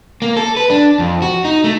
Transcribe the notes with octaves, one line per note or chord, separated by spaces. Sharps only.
A#3
A4
B4
D4
F2
F#4
D#4
A3